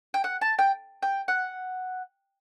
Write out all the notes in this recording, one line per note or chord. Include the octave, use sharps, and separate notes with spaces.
G5
F#5
A5
G5
G5
F#5